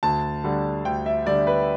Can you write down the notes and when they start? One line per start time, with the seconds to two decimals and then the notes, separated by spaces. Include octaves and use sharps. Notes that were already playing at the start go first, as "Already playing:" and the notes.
0.03 D2 A5
0.44 D3 G3
0.85 D2 G5
1.06 E5
1.26 D3 G3 D5
1.47 B4